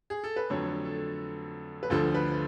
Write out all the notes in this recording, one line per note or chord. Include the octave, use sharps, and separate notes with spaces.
G#4
A4
B4
F2 D3 F#3 A3 C#5
A4
B4
D2 D3 F3 A4
B4